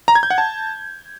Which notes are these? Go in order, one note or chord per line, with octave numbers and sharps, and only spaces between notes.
A#5
G#6
G6
F#5
A5